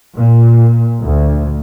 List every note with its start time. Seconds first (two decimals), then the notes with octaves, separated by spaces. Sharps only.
0.16 A#2
1.03 D2